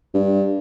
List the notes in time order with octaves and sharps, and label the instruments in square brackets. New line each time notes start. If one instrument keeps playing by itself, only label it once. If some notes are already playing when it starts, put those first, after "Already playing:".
[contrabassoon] G2